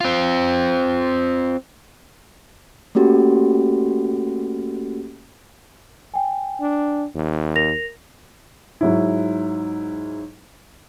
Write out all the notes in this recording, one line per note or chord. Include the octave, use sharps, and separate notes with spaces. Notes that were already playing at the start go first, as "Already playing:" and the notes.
C4 F4
A3 A#3 C#4 F#4 G4 A4
G5 G#5
D4
D#2
A#4 A#6 F7
G#2 F#3 E4